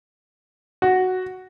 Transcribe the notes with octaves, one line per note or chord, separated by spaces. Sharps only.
F#4